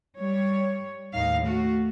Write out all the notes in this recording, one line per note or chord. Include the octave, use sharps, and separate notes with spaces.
G3 C#5
D#2 A2 D#4 F5
A3 F#4